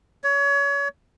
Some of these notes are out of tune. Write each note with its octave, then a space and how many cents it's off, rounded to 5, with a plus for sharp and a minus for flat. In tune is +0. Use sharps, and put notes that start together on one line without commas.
C#5 +30